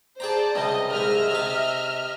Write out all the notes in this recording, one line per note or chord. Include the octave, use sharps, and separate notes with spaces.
G#4 C5 D5 G5 A5 A#5
C#2 C3 G3 D#5
C2 G#2 G#3 D#5 E5 F6
C3 A5